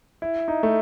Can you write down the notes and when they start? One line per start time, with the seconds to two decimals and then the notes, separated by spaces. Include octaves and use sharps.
0.22 E4
0.48 D#4
0.63 A3